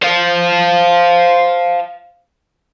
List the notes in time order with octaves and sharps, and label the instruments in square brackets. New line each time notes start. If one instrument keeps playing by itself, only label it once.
[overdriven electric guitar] C5 F5